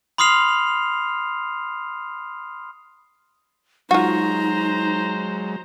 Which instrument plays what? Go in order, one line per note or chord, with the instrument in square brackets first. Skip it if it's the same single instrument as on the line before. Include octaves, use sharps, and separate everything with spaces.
[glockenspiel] B5 C6 D#6 F6 C7 F7
[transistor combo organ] F#3 G#3 [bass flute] D#4 [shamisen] F4 F#4 [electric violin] C5 A#5